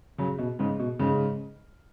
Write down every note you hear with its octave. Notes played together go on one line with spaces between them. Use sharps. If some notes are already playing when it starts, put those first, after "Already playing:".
C#3 F#3
B2
G#2 C#3
B2
G#2 C#3